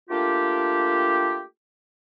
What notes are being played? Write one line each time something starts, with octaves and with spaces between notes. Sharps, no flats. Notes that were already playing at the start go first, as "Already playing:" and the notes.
A3 A#3 D4 F4 G4